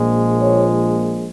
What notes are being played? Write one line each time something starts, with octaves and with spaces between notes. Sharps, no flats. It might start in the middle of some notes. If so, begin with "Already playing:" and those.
Already playing: A#1 A#2 F3 G#3
C#5